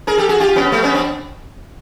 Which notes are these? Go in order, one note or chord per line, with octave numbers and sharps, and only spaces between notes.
G#4 A#4
G4 A4
F#4 G#4
F4 G4
B3 C#4
A3 B3
B3 C#4
C4 D4